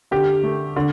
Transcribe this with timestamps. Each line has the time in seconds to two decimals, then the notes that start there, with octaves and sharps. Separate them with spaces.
0.11 D3 G4
0.44 A3
0.76 D3